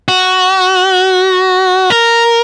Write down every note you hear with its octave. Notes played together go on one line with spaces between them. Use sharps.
F#4
A#4